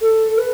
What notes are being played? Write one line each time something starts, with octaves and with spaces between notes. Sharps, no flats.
A4
B4